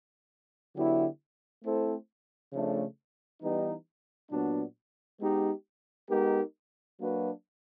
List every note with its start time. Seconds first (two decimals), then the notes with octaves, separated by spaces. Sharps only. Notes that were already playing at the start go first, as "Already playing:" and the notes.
0.74 D3 F#3 B3 E4 G4
1.63 A3 C4 E4 A4 C5
2.52 C#3 F3 A3 D4
3.41 E3 G3 B3 D#4
4.31 A#2 F#3 B3 D4
5.20 G#3 B3 D#4 G4
6.09 G#3 B3 D#4 G4 A#4
6.98 F#3 A#3 D4 F#4 B4